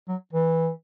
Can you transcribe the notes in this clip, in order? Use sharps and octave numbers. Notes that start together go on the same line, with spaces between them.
F#3
E3